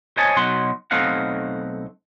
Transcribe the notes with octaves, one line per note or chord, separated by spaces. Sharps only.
C5 C#5 D#5 G#5 A5
B2 F#3 D#4 F#5 C6
B1 A3 C4 D#4 F5 F#5